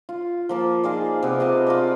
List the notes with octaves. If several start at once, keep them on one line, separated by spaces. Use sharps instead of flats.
F4
F3 A#3 A5
D#4 F4 G#4 D5
C3 B3
C3 D#5 F5 A5
F4 A#4 D5